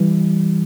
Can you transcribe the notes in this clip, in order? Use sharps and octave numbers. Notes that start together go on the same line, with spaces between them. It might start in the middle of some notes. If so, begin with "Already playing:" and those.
Already playing: E3 G3